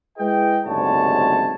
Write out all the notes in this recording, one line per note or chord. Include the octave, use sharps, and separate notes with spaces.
G#3 E4 G#4 B4 D#5 G5
F#1 D2 G#2 C3 C#5 A5